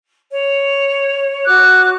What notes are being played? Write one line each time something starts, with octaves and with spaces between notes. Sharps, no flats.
C#5
F#4 D6 F#6